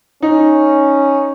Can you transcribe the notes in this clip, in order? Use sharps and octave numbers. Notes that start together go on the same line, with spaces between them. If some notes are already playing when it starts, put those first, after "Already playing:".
C#4 D#4